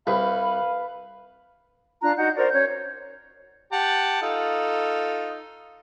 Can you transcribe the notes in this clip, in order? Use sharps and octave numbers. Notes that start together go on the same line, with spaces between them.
C2 B4 F5 B5
D4 F4 A#5 F#6
D#4 F#4 F#5 G6
F#4 A#4 C5 D5
C#4 C#5 G6
G4 F#5 A5
D#4 F4 A4